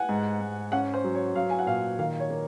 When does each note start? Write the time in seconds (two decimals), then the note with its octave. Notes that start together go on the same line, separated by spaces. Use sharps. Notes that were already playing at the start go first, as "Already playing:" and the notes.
Already playing: F#5 G#5
0.09 G#2
0.41 G#2
0.72 C#4 F#5
0.94 C5
1.04 F#3
1.15 C#5
1.35 F#3 F5
1.50 G#5
1.59 F#5
1.67 A#2 F5
1.99 D#3 F5
2.20 C#5
2.30 A#3